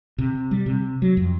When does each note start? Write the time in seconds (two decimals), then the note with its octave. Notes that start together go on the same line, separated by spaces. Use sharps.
0.18 C3
0.51 G3
0.66 C3
1.02 F#3
1.17 F2